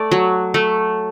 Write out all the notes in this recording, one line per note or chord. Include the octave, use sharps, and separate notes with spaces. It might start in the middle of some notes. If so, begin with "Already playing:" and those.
Already playing: A3 D5
F#3
A3